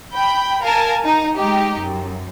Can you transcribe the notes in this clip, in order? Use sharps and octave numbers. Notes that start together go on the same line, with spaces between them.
G5 B5 G6
A#4 F5 G#5 A5
D#4 A#5
G#3 D#4 G4
F#2